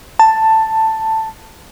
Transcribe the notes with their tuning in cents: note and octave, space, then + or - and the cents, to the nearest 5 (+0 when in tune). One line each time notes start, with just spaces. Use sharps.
A5 +10